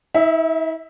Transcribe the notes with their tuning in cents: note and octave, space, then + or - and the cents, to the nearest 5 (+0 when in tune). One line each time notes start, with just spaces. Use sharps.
E4 -45 E5 +0